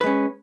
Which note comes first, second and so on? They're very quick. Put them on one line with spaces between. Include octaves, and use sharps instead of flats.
B4 G#3 C#4